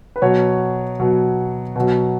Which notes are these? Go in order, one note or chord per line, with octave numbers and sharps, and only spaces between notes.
B4
B2 F#3 C#5
B2 F#3
B2 F#3